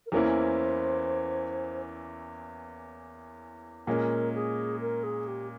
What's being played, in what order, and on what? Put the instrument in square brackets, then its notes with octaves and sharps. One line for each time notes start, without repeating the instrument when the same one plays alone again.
[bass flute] A#4
[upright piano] E2 E3 A#3 C#4 E4 [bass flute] C5
[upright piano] A#2 G#3 C#4 [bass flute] A#4
[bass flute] G#4
A#4
G#4
G4